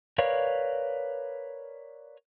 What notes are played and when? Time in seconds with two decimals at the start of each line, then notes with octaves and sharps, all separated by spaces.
0.18 A#4 B4 C#5 D5 F5